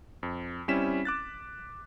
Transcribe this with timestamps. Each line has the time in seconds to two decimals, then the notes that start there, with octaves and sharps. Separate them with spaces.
0.23 F2
0.68 G3 C4 C#4 E4 B6 E7
1.05 D6 F#6 A6